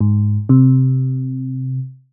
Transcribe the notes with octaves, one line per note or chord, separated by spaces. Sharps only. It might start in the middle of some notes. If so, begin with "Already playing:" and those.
G#2
C3